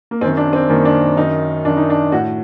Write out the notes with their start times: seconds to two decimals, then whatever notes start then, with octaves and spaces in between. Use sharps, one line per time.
0.11 A#3
0.21 F#2 D#3 C4
0.37 D4
0.53 C4
0.69 F#2 D#3 A#3
0.85 D4
1.17 F#2 D#3 D#4
1.65 F#2 D#3 D4
1.77 D#4
1.90 D4
2.12 A2 F#4